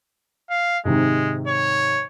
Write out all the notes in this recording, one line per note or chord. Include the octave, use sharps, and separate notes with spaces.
F5
G#2 C3 D#3 G#3
C#5